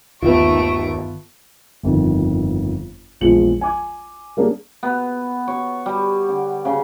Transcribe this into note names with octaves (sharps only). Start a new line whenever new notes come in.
G1 D#2 D#3 A3 B3 F4 C#6 D7
G1 F2 D#3
A#1 E2 F3 G#3 C#7 F#7
G#5 D6 G#6
G3 A#3 C#4 D4 G#4
B3
C#5
G3
D3
C#3